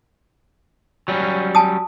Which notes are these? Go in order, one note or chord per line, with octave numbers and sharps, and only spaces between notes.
F#3 G3 C#4
G#5 A5 D#6